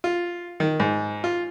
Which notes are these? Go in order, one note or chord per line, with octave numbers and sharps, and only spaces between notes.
F4
D#3
G#2
F4